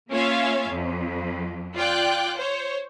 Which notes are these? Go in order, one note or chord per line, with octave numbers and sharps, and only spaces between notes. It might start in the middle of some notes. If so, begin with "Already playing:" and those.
A#3 C#4 F4 C#5 E5 F5
F2
F4 D5 G5 F#6
C5 C#5